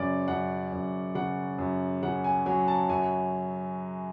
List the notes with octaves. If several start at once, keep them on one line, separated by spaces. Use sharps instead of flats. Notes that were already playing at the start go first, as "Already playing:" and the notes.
Already playing: F#2 C#3 C#5 D5
F#2 F#5
F#2
C#3 F#5
F#2
C#3 F#5
G#5
F#3 G#5
A5
F#2 G#5